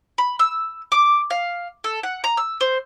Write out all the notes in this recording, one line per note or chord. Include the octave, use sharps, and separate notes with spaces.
B5
E6
D6
F5
A4
F#5
A#5
E6
C5